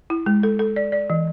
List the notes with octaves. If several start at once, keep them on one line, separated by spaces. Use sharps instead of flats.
E4
G#3
A4
A4
D5
D5
E3